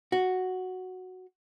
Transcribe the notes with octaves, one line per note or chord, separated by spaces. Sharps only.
F#4